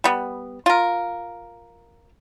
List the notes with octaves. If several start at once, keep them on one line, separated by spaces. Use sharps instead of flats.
G3 B3
F4 A#4